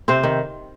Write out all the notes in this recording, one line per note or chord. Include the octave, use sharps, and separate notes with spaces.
C3 C4 C5
D#3